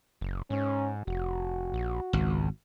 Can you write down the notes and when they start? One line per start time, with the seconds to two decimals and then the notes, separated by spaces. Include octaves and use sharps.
0.21 F#1
0.50 G#2 C#4
1.07 F1 F#4
1.73 A#1
2.13 G#1 C#2